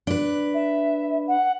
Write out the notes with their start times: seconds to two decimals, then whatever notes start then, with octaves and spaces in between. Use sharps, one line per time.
0.07 D4 B4
0.54 E5
1.27 F#5